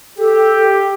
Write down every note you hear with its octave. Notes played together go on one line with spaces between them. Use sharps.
G4 A4